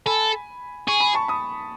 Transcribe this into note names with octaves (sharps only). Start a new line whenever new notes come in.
A4 G#5 B5
G#4 C#6
B5
A5 C#6
B5 D#6